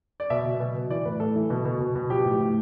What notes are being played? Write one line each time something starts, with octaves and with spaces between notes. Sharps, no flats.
D5
B2 E5
B2
B2
B2
E3 D5
A2 B4
A2 A4
E3
B2
B2
B2
B2
F3 G4
A2
A2